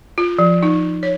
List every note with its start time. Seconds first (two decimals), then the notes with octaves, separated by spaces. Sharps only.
0.18 F4
0.39 F3
0.63 D#4
1.03 C#5